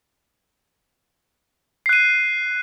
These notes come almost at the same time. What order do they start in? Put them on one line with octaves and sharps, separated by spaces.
C7 F#6 D#7